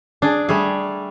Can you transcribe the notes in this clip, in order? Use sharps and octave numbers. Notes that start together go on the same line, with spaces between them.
D4 G#4
G3 A3 G#4